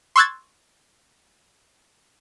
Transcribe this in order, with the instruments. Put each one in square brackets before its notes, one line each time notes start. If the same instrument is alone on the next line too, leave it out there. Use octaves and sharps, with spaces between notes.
[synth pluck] C6 C#6 E6 F#6 G#6 A6